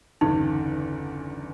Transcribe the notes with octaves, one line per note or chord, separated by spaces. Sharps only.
G1 E2 C#3 D#4